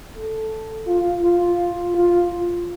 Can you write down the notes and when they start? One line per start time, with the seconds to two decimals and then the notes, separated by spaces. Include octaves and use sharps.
0.14 A4
0.87 F4
1.22 F4
1.95 F4